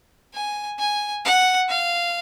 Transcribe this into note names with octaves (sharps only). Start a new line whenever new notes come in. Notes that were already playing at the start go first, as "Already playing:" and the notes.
G#5
G#5
F#5
F5